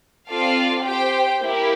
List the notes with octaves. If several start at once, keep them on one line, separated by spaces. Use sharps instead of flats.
C4 F4 A4 D5 F5
G4 C5 G5
A#3 E4 G4